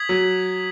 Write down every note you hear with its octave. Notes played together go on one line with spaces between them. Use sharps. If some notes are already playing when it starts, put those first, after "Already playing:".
Already playing: D#6 G#6 B6 F#7
F#3